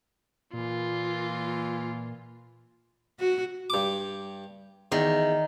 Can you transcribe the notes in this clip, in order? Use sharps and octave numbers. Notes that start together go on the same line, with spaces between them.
A#2 E3 F4
F#4
G2 D6
E2 D#3